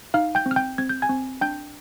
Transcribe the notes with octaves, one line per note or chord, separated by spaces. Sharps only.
D#4 F5 F6
G5 G6
C4
F6
G5 G6
C4 G#6
G6
G#5 G#6
C4
D4 G5 G6